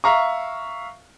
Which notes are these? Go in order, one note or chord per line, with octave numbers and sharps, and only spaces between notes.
E5 F5 A#5 C#6